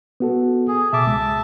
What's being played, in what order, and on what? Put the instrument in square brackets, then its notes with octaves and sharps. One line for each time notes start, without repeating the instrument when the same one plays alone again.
[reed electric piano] B3 F#4 A4
[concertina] G#4
[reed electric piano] B2 D6 [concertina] E5 A5
[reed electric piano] C#2 G#3